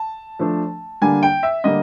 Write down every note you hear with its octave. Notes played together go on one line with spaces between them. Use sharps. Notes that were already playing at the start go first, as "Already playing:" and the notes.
Already playing: A5
F3 A3 D4
D3 G3 A#3 D4 G#5
G5
E5
D3 G3 A#3 D#5